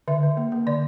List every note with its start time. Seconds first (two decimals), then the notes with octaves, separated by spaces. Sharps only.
0.08 D3 E5
0.23 D3
0.37 A#3
0.52 A#3
0.67 D3 D5